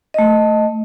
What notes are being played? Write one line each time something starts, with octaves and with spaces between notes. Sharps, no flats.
A3 D#5